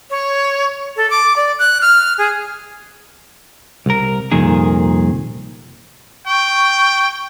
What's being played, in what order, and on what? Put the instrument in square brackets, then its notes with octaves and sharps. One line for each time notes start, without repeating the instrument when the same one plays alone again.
[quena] C#5
A4
D6
D5
F#6
F6
G#4
[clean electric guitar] C2 A#4
C2 F2 A#2 D#3 G#4
[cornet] G5 [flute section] C#6